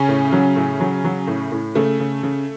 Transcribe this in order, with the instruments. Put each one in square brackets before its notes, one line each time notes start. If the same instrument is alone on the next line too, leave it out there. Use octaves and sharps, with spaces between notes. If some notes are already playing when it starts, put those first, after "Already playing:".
Already playing: [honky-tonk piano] C#3 C#4
A2
F#3
A2
F#3
F#3
A2
A2
C#3 A3
C#3
C#3